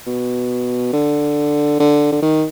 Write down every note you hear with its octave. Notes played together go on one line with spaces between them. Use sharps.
B2
D3
D3
D3
D#3